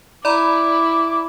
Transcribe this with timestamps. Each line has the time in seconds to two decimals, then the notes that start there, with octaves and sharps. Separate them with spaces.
0.25 E4 D5 A#5 B5 D6